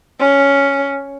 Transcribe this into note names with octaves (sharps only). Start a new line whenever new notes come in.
C#4